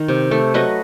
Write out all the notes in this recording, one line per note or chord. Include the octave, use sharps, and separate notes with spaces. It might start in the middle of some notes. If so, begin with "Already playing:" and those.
Already playing: D#3
C3
A3
F#3 B4 D#5